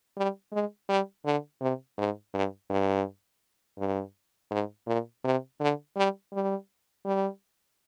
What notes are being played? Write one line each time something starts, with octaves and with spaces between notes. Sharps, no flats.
G3
G#3
G3
D3
C3
G#2
G2
G2
G2
G#2
A#2
C3
D3
G3
G3
G3